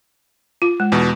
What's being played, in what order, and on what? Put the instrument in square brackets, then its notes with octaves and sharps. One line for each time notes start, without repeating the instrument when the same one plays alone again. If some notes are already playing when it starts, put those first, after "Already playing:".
[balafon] F4
G#3
[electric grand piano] E2 B2